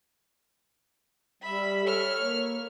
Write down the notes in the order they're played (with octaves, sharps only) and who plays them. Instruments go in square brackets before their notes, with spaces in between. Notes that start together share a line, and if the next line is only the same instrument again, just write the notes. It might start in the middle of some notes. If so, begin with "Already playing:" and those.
[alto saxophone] G3 [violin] E5 B5
[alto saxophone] A4 [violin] C#5 F6
[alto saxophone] A#3